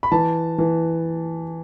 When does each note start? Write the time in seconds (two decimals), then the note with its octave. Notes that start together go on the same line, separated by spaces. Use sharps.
0.03 B5
0.12 E3 A5
0.58 E3